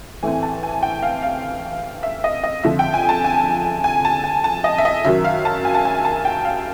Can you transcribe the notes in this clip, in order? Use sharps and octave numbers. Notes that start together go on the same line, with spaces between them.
A2 E3 A3 C4 G#5
A5
G#5
G5
F5
F5
E5
D#5
D#5
F2 D3 F3 E5
G5
G#5
A5
G#5
G#5
A5
G#5
A5
D#5
E5
D#5
F#2 D#3 F#3 E5
F5
A5
G#5
A5
G#5
A5
G5
F5